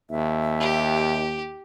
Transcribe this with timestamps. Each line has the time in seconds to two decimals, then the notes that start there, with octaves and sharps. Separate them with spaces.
0.10 D#2 E5
0.60 G4